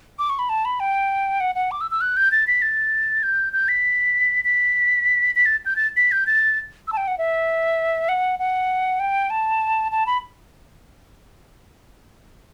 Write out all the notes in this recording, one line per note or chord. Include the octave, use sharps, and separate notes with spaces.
D6
C#6
B5
A5
B5
G5
F#5
F#5
D6
E6
E6
F#6
G6
A6
B6
A6
G6
G6
B6
B6
B6
A6
G6
A6
B6
G6
A6
E6
A5
G5
F#5
E5
F#5
F#5
G5
A5
A5
B5